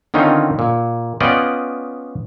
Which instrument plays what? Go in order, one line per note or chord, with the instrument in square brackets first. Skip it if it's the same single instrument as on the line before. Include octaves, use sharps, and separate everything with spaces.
[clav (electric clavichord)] D3 D#3 C4 C#4 D#4 F4
A#2
B3 C#4 F4 D5 D#5 G5